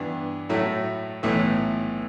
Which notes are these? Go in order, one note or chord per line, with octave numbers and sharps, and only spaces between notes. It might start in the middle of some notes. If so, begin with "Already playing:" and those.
Already playing: G2 E3 B3 D4
A2 F#3 A3 E4
B1 A2 E3 A3